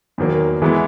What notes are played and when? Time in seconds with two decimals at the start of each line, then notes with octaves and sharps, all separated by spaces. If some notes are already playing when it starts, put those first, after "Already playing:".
0.18 E2 D#3 F#3 A#3
0.62 E3 G#3 B3 E4